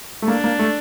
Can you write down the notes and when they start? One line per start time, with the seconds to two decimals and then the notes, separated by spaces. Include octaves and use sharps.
0.22 A3
0.28 A#3 D4
0.44 A#3
0.59 A3